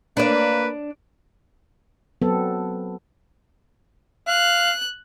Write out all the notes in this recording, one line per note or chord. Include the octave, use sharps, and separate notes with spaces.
A#3 D4 B4 D5
F#3 B3 C4 A4
F5 F#6